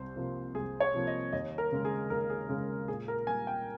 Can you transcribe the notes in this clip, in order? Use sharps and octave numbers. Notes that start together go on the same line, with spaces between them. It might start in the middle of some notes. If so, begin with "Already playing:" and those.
Already playing: C2 C5
C3 F3 A#3
C2 G#4
C#5
C3 F3 A#3
D#5
D#2 D#5
A#4
C#3 G#3
G#4
D#2 A#4
G#4
C#3 G#3 G#4
A#2 G#4
A#4
G3 A#3 G#5
G5